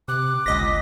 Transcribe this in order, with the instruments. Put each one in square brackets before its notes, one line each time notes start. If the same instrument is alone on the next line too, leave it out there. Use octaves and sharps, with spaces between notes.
[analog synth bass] C3 [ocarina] D6 [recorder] F#6
[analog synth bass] G1 [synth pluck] C#2 D#5 A#6 [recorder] B6